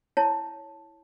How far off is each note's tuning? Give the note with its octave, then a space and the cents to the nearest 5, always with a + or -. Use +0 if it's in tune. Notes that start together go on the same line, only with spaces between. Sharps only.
E4 +0 C#5 +0 A5 +0